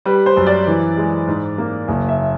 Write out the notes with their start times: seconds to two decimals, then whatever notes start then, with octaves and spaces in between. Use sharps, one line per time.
0.05 G3 B4
0.26 C5
0.36 F#2
0.47 D5
0.67 E3
0.97 G#3
1.28 G#2
1.58 A#3
1.88 F#1
2.08 E5